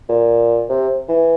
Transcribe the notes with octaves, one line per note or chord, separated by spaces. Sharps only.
A#2
C3
E3